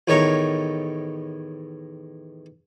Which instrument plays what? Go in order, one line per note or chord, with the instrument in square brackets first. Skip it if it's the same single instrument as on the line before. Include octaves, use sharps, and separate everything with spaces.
[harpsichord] E2 A2 D#3 C#5 A#5 C#6